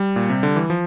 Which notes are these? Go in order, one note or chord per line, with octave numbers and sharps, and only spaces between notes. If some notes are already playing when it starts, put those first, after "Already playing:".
Already playing: G3
A#2
C3
D3
E3
F3